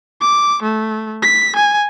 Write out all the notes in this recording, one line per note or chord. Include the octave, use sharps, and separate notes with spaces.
D6
A3
B6
G#5